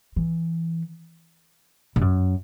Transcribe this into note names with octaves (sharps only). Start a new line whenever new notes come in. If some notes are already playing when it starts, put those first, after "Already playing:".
E3
G2
F#2